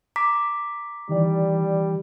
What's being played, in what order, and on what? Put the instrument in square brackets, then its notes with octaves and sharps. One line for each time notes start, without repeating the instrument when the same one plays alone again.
[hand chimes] A#5 D6 B6
[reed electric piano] D#3 E3 D5 [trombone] G3